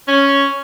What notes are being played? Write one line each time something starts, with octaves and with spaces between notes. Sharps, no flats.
C#4